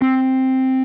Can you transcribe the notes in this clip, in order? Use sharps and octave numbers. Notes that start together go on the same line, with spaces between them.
C4